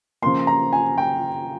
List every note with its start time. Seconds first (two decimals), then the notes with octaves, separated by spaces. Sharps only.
0.22 C#3 F3 A#3 C6
0.47 A#5
0.73 G#5
0.98 G5